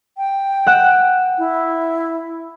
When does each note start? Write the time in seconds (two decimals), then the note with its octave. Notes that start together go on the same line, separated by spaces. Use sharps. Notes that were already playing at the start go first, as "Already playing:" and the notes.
0.17 G5
0.67 F#5 F#6 E7
1.38 E4